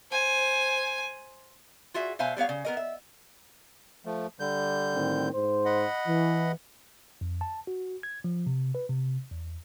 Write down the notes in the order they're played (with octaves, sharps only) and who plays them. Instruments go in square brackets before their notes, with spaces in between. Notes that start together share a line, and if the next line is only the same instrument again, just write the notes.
[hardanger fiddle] C5 G#5
[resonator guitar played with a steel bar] F4 F#4 G#4 E5
B2 C5 E5 F5 G#5
G3 B3 C#5 F5
C#3
B3 A#4 D#5
E5
[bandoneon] F3 A3
D3 G3 G6
[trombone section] A2 D#3 C4
G#2 C5
[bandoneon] D#5 F#5 B5
[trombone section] E3
[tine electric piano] F2
A5
F#4
G#6
F3
C3
B4
C3
E2